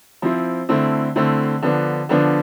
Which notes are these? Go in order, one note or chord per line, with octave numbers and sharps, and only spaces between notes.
F3 C4 E4
D3 A3 C4 E4
D3 A3 C4 E4
D3 F3 B3 D4
D3 F3 B3 D4